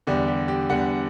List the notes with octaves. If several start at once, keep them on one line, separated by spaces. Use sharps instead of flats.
E2 D3 G3 G4
G4
G4
E2 D3 G3 F#5